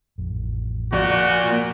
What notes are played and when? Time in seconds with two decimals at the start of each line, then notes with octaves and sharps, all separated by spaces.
0.18 A1 F2
0.93 F3 A#3 F#4 D5